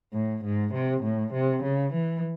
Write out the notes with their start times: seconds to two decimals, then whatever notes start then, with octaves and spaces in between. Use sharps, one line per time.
0.13 A2
0.44 G#2
0.74 C3
1.04 A2
1.33 C3
1.63 C#3
1.94 E3